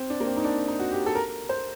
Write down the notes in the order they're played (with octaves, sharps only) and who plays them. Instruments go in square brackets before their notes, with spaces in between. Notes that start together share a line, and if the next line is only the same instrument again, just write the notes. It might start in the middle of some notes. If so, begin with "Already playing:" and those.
Already playing: [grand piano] C4
D4
A#3
C4
D#4
D4
D#4
F#4
G4
A4
A#4
C5